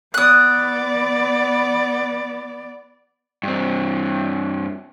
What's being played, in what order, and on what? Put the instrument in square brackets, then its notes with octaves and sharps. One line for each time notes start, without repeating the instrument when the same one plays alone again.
[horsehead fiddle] B3 D5 [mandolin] D#6 F#6
[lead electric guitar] G2 C4